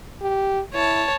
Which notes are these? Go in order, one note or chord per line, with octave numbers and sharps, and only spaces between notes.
G4
E4 C#5 A5